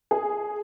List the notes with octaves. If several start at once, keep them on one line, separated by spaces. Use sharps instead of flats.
G#4